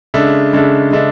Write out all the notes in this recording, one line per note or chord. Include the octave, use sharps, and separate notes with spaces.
C#3 G#3 D4 A4 E5
C#3 G#3 D4 A4 E5
C#3 G#3 D4 A4 E5